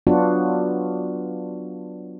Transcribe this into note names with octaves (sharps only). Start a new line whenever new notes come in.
F#3 B3 D4 F4 F#4